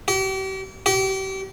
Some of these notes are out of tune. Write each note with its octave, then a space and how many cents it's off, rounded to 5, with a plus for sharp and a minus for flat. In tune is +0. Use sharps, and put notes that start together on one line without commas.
G4 -40
G4 -35